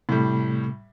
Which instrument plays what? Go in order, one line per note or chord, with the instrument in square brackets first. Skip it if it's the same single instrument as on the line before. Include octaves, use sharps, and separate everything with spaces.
[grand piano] A2 G3 [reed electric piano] C3 A3